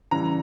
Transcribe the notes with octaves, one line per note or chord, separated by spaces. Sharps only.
C#3 E3 G3 A#5